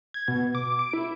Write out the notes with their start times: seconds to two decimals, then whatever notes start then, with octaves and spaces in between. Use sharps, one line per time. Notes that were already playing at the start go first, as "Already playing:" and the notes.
0.14 G#6
0.28 B2
0.55 D6
0.79 D7
0.93 E4